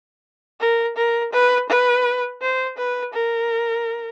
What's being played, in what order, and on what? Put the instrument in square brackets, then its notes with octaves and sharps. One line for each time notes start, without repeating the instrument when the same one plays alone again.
[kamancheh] A#4
A#4
B4
B4
C5
B4
A#4